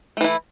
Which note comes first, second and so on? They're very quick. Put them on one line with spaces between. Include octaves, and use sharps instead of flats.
A3 E3 E4